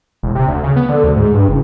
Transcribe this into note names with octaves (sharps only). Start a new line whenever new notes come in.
E1
C3
D2
C#3
B3
D3
D2
G#2
G2
F#1